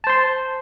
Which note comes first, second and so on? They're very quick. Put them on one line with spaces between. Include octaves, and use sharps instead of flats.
A5 C5 C6